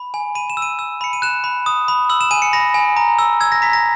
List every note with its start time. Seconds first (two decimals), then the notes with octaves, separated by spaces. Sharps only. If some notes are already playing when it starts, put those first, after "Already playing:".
Already playing: B5
0.14 G#5
0.35 B5 D#7
0.50 E7
0.57 E6
0.62 D#7
0.79 E6
1.01 B5 C#7
1.13 D#7
1.22 F#6 E7
1.44 B5
1.66 D#6
1.88 B5
2.10 E6 F#7
2.21 E7
2.31 G#5 D#7
2.42 C#7
2.53 B5 A#6
2.74 G#5
2.97 A#5
3.19 E6
3.41 E6 G#6
3.52 A#6
3.62 A#5 B6
3.73 A#6